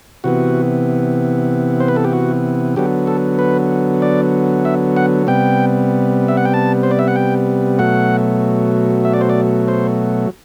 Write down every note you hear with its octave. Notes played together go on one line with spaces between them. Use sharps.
C3 E3 B3 F#4
C5
B4
A4
G4
F#4
D3 F#3 B3 G4
A4
B4
D5
E5
F#5
C3 G3 B3 G5
E5
F#5
G5
A5
C5
D5
E5
F#5
G5
B2 F#3 A3 F#5
E5
D5
C5
D5
C5